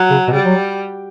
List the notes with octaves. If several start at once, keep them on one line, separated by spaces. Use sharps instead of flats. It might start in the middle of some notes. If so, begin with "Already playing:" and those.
Already playing: F#3
C#3
B2
C#3 G3
F#3